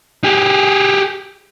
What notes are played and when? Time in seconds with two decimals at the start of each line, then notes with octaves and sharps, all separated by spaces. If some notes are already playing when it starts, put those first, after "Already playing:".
0.24 G4 G#4